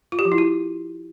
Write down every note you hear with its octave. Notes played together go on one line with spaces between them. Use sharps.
F4
G4
F3
E4
F#4